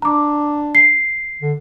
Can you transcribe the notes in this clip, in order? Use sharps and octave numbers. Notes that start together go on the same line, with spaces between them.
D4 A#5 D6
C7
D3